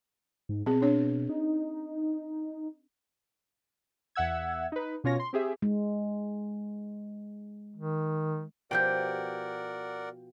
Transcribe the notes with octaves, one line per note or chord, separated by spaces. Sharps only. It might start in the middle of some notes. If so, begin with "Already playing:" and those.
G#2
B2 C4 G#4
D4 C#5
D#4
E2 E5 F#5 E6 G#6
D#4 B4
B2 C#4 F4 C#5 A#6
C6
C4 G4 G#4 E5
G#3
D#3
B2 F3 G4 A#4 D5 F#5 G5 G6